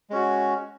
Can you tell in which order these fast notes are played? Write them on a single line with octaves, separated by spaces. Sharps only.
G#3 C#4 F#4